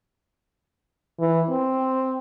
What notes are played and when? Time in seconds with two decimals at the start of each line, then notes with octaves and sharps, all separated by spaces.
1.20 E3
1.49 C4